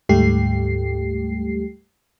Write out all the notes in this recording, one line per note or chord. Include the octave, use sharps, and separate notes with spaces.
D2 G#2 G3 A3 G4 C7